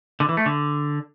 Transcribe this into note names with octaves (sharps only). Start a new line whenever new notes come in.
D3
E3
A3
D3